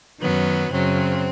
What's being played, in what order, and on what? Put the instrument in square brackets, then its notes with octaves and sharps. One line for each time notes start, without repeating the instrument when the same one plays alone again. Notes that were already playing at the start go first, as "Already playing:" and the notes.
[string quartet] F#2 D#3 F#3 B3
F#2 C#3 F#3 C4